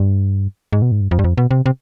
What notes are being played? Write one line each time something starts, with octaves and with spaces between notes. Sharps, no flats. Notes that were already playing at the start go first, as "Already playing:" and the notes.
Already playing: G2
G#2
B2
G#2
G2
F2
G2
F2
B2
C3
C3